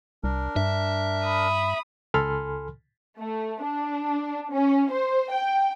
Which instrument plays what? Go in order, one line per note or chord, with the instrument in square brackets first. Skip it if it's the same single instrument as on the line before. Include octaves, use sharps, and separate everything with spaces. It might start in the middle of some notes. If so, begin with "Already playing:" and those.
[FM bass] C2 [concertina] D4 A#4
[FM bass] G2 [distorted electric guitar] E5
[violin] B5 D#6
[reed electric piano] C#2 A4 G#5 B5 C6 F6
[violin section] A3
D4
C#4
C5
G5